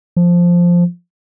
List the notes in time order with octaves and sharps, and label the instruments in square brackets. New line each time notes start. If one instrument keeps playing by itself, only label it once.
[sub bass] F3